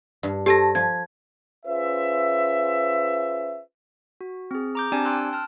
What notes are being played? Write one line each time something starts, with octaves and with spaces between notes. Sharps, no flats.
G2
G4 A4 C5 C#5 A5 A#6
F3 G#6
C#4 F4 G#4 B4 C5 E5
F#4
C4 G#4
A#5 D6 G6
C4 D4 G4 D5 G#5 A5
G5 C6 E6 F#6
A5 F6